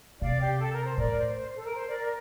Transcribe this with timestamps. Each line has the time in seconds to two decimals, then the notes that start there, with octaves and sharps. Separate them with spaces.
0.21 C3 D5 F5
0.41 G4
0.59 A4
0.72 A#4
0.85 C5
0.97 A2 A#4 D5
1.17 C5
1.36 C5
1.55 A4
1.64 A#4
1.74 C5
1.86 A#4 D5
1.99 A#4